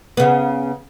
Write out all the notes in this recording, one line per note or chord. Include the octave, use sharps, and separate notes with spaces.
C#3 B3